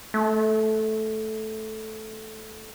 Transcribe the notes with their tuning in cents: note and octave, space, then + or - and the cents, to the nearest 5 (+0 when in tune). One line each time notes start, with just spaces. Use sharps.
A3 -10